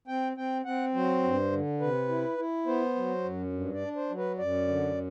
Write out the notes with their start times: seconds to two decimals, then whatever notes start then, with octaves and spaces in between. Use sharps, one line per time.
0.08 C4 G5
0.37 C4 G5
0.65 C4 F#5
0.94 F#3 C5
1.23 G2
1.52 D3
1.80 C3 B4
2.09 E4
2.38 E4
2.66 B3 C5
2.96 F#3
3.24 F#2
3.52 G2
3.74 D5
3.81 D4
3.96 C5
4.10 F#3
4.17 B4
4.39 F#2 D5
4.68 D3